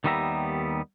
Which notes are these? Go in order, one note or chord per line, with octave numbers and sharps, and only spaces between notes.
D#2 D#3 G3 B3 E5 A#5